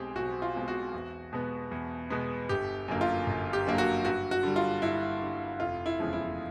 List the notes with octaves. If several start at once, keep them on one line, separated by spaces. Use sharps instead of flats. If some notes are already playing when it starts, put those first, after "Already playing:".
Already playing: B1 B2 G#3 C4 G4 G#4
B1 F#4
F4
B2 G#3 C4
F#4
E2
B2 G#3 B3
E2
B2 G#3 B3
G1 G4
F#2 D3 F#3 A#3
F4
G1
G4
F#2 D3 F#3 A#3
F#4
G2 F#4
F#4
D3 G3
F4
G2 E4
D3 G3
F1 F4
E4
E2 C#3 F3 G#3
E4